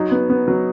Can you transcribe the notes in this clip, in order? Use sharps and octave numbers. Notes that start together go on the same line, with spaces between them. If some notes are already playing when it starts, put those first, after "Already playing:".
Already playing: F#3 D#4
B3
B3
F#3